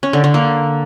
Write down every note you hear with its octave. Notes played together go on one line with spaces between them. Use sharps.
C#4
D3
D3
A#3